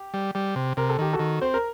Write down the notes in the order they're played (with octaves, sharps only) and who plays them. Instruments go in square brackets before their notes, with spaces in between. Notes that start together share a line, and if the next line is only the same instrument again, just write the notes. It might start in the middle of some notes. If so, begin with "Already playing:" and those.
Already playing: [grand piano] G4
[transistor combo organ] G3
G3
C3
[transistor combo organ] C3 [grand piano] A#4
[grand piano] A4
[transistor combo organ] D#3 [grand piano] G4
[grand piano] F#4 A4
[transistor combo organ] D#3
[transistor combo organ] C4 [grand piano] C5
[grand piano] A#4